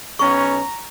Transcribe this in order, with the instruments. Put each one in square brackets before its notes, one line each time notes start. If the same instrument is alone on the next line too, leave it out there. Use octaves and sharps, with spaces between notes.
[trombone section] B1 B3 C#4 [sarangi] A#5 [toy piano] C#6